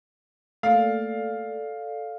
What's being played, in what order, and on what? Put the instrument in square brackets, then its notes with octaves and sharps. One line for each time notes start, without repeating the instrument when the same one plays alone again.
[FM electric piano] A3 A#3 [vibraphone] A4 D5 [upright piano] F5